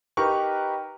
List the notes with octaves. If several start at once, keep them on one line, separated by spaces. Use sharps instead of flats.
D#4 G4 A#4 B4 C#6